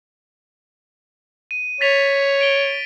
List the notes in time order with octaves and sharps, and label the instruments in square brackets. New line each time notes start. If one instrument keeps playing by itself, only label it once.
[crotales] D#7
[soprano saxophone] C#5 [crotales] A6 B6 F7
[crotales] D7 G7